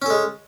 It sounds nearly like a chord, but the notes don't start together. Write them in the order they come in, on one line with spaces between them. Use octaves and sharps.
C#4 A4 G#3